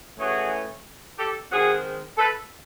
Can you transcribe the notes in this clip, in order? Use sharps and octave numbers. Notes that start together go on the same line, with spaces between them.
A2 E3 A3 C#4 F#4 G#4
G4 A4
D#3 G#3 C4 F#4 G#4
A4 B4